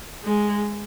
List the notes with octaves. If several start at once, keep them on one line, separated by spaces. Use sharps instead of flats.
G#3